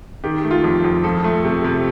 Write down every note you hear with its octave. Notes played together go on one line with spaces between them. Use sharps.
D#3 G4
A3
F4
F2
F2
F3 A4
A3
C3
C3